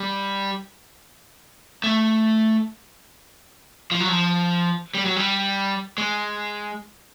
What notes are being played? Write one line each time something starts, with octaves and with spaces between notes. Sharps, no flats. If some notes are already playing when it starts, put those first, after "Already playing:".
Already playing: G3
A3
F3
F#3
F3
G3
F#3
G3
G#3